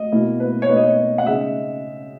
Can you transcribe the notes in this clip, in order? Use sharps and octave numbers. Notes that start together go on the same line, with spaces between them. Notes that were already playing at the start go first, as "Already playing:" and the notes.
Already playing: D#5
B2 A#3 E4
B4
C#5
B2 A#3 D#4 B4
D#5
C#5
F#5
C#3 G#3 D#4 E5